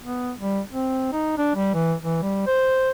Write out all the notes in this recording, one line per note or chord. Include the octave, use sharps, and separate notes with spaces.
B3
G3
C4
D#4
D4
G3
E3
E3
G3
C5